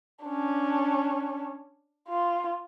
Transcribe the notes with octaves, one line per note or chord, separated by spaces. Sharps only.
C#4 D4
F4